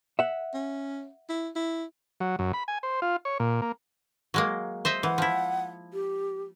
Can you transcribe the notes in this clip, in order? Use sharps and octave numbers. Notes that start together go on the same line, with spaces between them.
E5 F#5
C#4
E4
E4
F#3
F#2
B5
G#5
C5
F4
C#5
A#2
A#3
F#3 G#3 A#3
C5 D#5 E5
E3 F#5
F3 E4
G4